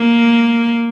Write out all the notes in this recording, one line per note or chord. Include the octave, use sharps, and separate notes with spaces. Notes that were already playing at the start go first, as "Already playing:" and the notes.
Already playing: A#3